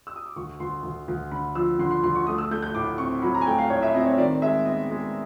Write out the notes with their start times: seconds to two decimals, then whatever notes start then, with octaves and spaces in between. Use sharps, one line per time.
0.07 E6
0.16 D#6
0.26 D6
0.36 D2 C#6
0.60 D2 C6
0.83 D2
1.08 D2
1.32 D3 B5
1.55 F3 E6
1.79 D3 C6
1.91 C6
2.03 D2 C6
2.15 C#6
2.27 A3 D#6
2.38 E6
2.51 A3 G6
2.62 G6
2.75 A2 D6
2.98 C4 C#6
3.22 F#3 B5
3.34 A#5
3.41 G#5
3.46 A3 G5
3.58 F5
3.70 A2 C#5
3.83 E5
3.94 C4 D#5
4.06 C#5
4.18 D#3 D5
4.42 G#3 E5
4.65 B3 D#5
4.90 G#3